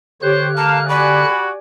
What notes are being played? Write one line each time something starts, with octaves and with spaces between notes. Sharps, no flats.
D3 G4 C5 C#5 F#6
A#3 F5 A5
F#4 G4 D5 G#5 B5